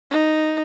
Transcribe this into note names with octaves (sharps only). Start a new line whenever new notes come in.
D#4